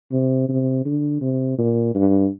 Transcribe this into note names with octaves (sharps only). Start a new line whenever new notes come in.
C3
C3
D3
C3
A#2
G2